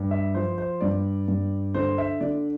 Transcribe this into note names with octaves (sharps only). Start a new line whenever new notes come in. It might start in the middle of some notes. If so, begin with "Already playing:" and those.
Already playing: G2
E5
F3 C5
C5
G2 D5
G2
D3 C5
E5
D3 D5